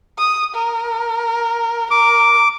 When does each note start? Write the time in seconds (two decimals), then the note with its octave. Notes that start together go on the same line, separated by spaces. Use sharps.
0.18 D#6
0.55 A#4
1.91 A#4 D6